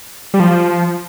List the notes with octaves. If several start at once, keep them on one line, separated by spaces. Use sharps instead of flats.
G3
F3